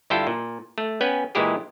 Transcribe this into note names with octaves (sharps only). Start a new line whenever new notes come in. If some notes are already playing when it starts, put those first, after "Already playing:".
G2 D3 E4 F4 A4 G5
A#2
A3
B3 C#4 B4 G5 G#5
A#2 E3 G#3 E4 G4 G#4